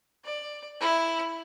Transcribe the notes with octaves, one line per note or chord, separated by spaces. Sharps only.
D5
E4